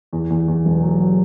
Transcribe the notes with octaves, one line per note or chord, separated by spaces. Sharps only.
E2
E2
E2
E1
F#3
F#3